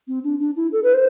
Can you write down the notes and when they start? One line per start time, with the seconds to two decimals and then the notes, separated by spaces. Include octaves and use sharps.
0.08 C4
0.24 D4
0.39 D4
0.56 E4
0.72 A4
0.83 B4
0.93 C5